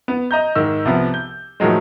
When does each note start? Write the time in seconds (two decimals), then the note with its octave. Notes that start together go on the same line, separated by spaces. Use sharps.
0.08 B3
0.31 D#5 A#5 G6
0.55 G#2 D#3 E6
0.85 C2 F3 B3
1.14 G6
1.60 A2 D#3 F3 F#3 G#3